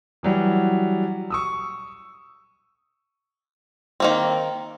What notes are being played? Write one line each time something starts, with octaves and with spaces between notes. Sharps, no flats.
E3 F#3 G3
C#6 D#6 E6
D#3 A#3 C4